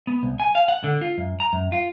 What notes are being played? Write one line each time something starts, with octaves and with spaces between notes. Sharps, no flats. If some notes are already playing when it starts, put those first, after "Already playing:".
B3
C2
G#5
F5
F#5
D3
F4
F#2
A#5
F#2
F4